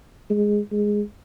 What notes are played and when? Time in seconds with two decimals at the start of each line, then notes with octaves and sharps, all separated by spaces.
0.30 G#3
0.72 G#3